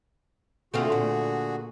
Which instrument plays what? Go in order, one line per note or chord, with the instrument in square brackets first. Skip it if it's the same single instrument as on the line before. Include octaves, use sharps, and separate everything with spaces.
[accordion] D3 F#4 G#4 [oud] A3 C4 F4
[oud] A#2